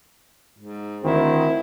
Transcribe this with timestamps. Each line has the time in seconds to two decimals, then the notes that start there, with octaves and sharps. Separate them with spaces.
0.59 G#2
1.04 D2 D#3 C4 E4